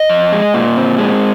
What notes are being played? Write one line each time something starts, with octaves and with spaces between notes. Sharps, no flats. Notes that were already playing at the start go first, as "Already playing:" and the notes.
Already playing: D#5
F2
G#3
A#2
C4
G#3